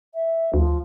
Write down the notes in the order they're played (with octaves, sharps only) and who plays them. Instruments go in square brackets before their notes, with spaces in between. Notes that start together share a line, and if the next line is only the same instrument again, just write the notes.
[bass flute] E5
[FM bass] D2 [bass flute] F3